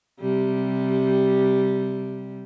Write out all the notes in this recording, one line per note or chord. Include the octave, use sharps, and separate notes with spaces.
C3 G3